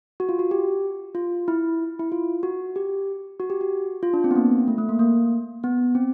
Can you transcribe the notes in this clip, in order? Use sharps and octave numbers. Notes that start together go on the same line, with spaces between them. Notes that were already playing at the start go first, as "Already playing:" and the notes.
F#4
F4
F#4
G4
F4
E4
E4
F4
F#4
G4
F#4
G4
F#4
F4
D4
C4
B3
A#3
A3
A3
A#3
A#3
B3
C4